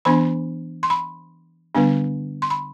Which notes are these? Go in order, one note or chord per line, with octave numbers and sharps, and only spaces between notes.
E3 B3 D4 B5
C6
B5
D3 G3 B3 D4
C6
B5